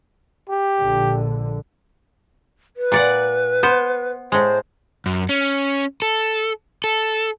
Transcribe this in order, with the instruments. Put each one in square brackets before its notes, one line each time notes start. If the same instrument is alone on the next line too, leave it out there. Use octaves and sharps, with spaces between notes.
[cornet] G4
[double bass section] A#1 D3
[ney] B4
[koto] A#2 D5 F#5
B3 C5
[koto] A2 G#3 [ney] C5
[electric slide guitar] F#2
C#4
A4
A4